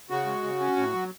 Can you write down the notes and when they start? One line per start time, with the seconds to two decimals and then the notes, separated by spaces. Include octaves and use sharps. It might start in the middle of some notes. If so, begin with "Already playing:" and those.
0.10 C#3 F#4
0.26 G#3
0.43 C#3
0.60 C#4
0.77 A2
0.94 F#3